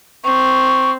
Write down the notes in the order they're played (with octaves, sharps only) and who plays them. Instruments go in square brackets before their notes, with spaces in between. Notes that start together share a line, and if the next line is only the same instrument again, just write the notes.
[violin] C4 [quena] C#6